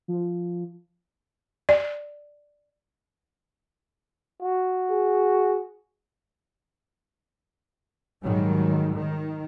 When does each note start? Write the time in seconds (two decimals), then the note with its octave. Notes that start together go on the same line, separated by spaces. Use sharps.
0.08 F3
1.69 D5
4.42 F#4
4.90 G#4
8.23 G#2 D#3 F#3 G3
8.95 D#3